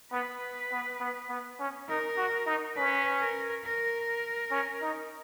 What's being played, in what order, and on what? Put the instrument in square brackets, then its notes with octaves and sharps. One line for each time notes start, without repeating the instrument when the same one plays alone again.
[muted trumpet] B3 [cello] B4
[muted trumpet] B3
B3
B3
C#4
[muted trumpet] D#4 [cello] A#4
[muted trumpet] F#4
D#4
[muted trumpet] C#4 [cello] B4
[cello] A#4
A#4
[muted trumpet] C#4
D#4